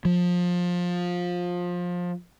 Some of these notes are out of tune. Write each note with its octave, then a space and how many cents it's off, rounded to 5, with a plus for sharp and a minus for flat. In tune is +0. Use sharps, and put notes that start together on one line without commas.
F3 +20